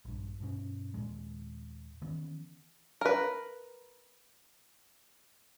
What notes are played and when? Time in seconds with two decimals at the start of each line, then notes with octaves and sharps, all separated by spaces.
0.05 A#1 G2
0.40 G2 B2 C#4
0.94 D#2 A#2 G#3
2.02 D#3 E3 B3 C#4
3.01 A#4 B4